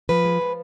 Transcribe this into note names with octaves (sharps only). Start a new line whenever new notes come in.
F3 B4
G#3
F3